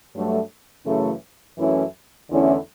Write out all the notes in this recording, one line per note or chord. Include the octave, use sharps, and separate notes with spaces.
G2 F#3 A3 D4
F#2 C#3 E3 A3
F#2 E3 A3 C#4 E4
E2 D3 A3 C#4 E4